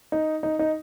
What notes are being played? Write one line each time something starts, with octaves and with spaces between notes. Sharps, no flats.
D#4
D#4
D#4